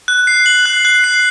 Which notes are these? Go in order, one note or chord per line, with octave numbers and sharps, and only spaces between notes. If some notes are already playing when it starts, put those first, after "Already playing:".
F#6
C7
F#7
F#6
F#6
C7